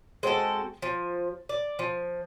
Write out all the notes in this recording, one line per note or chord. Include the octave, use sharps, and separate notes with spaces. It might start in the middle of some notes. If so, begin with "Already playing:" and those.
G#3 C4 F#4 A4
F3
D5
F3